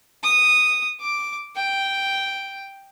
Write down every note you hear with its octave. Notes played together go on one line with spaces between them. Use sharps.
D#6
D6
G5